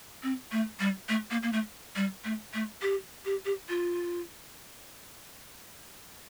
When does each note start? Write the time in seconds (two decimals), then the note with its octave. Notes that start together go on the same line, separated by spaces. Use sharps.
0.23 C4
0.52 A3
0.80 G3
1.09 A3
1.31 A#3
1.43 A#3
1.53 A3
1.96 G3
2.24 A3
2.54 A3
2.82 G4
3.25 G4
3.45 G4
3.69 F4